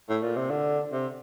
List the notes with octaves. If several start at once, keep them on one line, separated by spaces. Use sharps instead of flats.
A2
A#2
C3
D3
C3